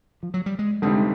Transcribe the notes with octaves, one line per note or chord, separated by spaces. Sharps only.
F3
F#3
G3
G#3
G1 F2 C3 D#3 G3 G#3